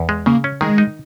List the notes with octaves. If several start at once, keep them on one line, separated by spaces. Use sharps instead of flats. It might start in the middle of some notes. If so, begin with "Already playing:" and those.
Already playing: E2
G#3
C#3 A#3
C#4
D#3 G#3
D#4